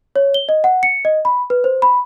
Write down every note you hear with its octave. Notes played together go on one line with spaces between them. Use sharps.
C#5
G7
D#5
F#5
C#7
D#5
B5
B4
C5
B5